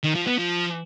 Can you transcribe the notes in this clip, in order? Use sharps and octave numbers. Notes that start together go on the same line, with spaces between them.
D#3
F3
B3
F3